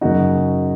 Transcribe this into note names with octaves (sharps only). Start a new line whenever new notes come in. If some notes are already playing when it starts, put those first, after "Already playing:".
F#2 C#3 F#3 D#4 F#4